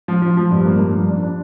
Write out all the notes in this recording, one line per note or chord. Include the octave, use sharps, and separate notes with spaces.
F3
F3
F3
G2
A#3
G2
F3
D4
D4